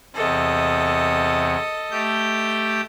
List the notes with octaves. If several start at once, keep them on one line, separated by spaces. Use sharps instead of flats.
E2 C3 A4 D#5
A3 G4 G6